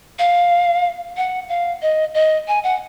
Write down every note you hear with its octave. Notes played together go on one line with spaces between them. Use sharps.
F5
F#5
F5
D#5
D#5
G#5
F#5